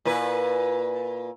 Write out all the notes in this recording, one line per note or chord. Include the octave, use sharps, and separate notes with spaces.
A#2 E4 B4